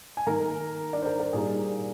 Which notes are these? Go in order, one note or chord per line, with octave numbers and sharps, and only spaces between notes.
G#5
D#3 A#3 D#4 A#4 A#5
D4 D5
C5
A#4
A#4
A#2 G3 A#3 D#4 G#4